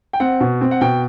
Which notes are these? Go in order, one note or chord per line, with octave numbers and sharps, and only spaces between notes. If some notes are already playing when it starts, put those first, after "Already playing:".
G5
C4 F#5
B2
C4
F#5
B2 G5